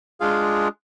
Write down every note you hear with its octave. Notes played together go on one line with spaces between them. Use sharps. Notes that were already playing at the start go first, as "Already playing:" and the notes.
G#3 D4 F4 G#4 F5